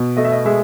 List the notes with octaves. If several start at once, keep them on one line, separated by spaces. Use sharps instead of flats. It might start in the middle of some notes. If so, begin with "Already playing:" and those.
Already playing: B2
A3 D#5
E5
D#5
G#3 E5